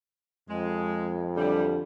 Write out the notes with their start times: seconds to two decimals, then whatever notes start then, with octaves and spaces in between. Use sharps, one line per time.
0.49 F2 G#3
1.37 D3 E3 F#3 G3